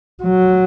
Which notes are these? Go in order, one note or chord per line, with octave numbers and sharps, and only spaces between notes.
F#3